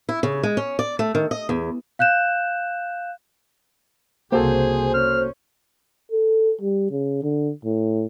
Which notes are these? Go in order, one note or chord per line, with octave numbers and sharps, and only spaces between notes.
E4
C#3
G#3
C#4
D5
A3
D#3
D#5
E2
F5 F#6 G6 E7
C2 C#3 A#3 F#4 G#4 A4 C5
C#4 F6
A4
G3
C#3
D3
A2